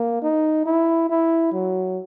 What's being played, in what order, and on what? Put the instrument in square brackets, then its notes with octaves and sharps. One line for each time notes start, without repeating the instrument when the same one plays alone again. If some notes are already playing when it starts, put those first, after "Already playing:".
Already playing: [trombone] A#3
D#4
E4
E4
F#3